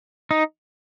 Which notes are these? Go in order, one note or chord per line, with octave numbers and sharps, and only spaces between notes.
D#4